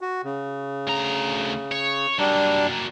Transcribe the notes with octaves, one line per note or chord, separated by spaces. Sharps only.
F#4
C#3
D2 A#5
C#5
F#3 G3 A#3 D4